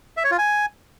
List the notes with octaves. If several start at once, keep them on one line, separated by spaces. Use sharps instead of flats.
E5
C#5
F4
G#5